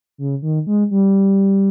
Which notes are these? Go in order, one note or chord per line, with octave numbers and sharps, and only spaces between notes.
C#3
D#3
G#3
G3